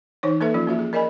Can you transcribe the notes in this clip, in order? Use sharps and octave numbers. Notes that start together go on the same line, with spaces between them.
E3 D#4 C5 C#5
A#3 A4 B4 E5
F3 C#4 F4
A#3 F#4 E5
G#4
A#4 D5 D#5 G#5 B5